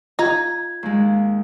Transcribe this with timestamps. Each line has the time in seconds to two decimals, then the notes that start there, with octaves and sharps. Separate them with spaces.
0.19 D#4 F4 G#6
0.83 D#2 G#3